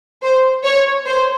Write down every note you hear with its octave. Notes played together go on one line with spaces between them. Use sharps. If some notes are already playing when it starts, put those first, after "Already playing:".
C5
C#5
C5